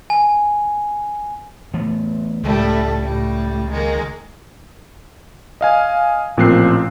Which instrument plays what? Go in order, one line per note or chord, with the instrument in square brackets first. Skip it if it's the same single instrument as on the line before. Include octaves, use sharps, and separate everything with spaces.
[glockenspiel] G#5
[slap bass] E3 A3 B3
[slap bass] C#2 [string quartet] A2 G3 A3
[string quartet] A2 G3
D#3 G#3 A#3
[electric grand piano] D#5 F5 G#5
A1 A#2 F3 C4 F#6 C7